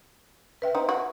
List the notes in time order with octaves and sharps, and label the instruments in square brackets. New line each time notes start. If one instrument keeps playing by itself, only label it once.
[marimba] B4 E5 G5
[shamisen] C4 D#4
F#4